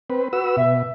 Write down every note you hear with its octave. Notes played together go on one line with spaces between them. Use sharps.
C4 B4
F#4 B4 E6
B2 E5